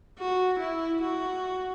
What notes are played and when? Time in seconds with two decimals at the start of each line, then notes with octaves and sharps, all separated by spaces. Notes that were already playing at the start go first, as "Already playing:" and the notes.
0.19 F#4
0.60 E4
1.02 F#4